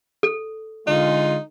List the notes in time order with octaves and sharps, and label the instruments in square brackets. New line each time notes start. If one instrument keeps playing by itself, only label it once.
[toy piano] A4
[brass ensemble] D3 G#3 F4 [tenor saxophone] D#4